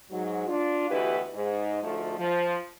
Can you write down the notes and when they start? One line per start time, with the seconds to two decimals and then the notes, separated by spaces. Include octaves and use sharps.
0.11 G#2 F#3
0.47 D4 F4
0.90 D2 B2 E3 E4 G4 B4
1.34 G#2
1.83 D2 G#2 F3 A3
2.18 F3